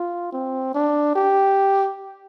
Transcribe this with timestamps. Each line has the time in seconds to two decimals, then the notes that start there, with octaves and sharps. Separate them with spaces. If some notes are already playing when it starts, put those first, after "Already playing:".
Already playing: F4
0.33 C4
0.75 D4
1.16 G4